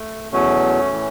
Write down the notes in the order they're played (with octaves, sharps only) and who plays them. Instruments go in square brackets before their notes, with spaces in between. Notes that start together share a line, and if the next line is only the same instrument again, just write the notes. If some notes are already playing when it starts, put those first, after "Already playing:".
Already playing: [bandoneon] A3
E2 B2 F#3 A3 C#4
A2 E3